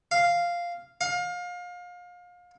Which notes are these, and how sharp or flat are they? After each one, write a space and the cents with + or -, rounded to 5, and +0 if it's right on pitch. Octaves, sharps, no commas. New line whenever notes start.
F5 -5
F5 +30